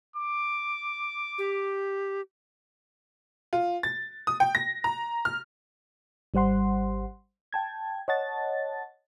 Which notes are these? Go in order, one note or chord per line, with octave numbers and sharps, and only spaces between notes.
D6
G4
F4
A6
D#6
G5
A#6
A#5
F6
G#1 G3 C5 F#5 C6
G5 A5 G#6
C#5 D#5 F#5 A5 A6